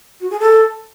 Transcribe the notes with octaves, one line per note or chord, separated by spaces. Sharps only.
F#4
G#4
A4